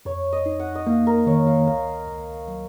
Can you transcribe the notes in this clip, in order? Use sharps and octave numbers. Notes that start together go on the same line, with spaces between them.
F2 C#5
D#5
D#4
F#5
D#5
A#3 F5
A#4
D#3 C#5
F5
C#2 F5
C#2
F#3